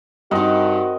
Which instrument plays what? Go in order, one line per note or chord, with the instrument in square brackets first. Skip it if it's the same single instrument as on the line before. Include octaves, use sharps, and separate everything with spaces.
[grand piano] G2 D#4 [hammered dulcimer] C4 A#4 D#5 [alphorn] F#4